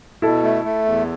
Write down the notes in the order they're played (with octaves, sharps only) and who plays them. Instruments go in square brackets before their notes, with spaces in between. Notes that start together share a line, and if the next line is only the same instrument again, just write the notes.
[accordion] B2 [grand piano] E4 A4
[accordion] A3
A3
E2